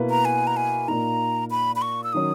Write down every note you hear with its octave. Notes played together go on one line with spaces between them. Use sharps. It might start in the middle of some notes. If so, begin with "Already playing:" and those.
Already playing: B2 A#3 E4 B4
A#5
G#5
A#5
G#5
A#2 A#3 D#4 A#5
B5
B5
C#6
E6
D#3 F#3 C#4 D#6